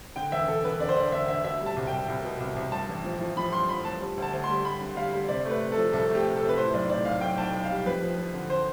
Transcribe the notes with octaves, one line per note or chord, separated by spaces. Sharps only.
D3 G5
E1 E5
E1 A4
E1 B4
D3 D5
C5
E1 D5
D3 E5
D2 E5
B2 E5
G3
A5
C2
G5
C2
C2
B2
C2
C2
G2 A5
A1
F3
F3
F3 B5
G2 C6
F3 B5
G2 A5
G3
D2
A5
D2
C6
G3
G3 B5
D3
G3 F5
G3
C3 D5
A3
B4
C3
F3 A4
C2 A4
A3
G4
C3
A4
C3
B4
A2 C5
B1 D5
A2 D5
B1 F5
B1 G5
B1 A5
G5
B1
F5
G3
F2 B4
F3
F3
D3
C5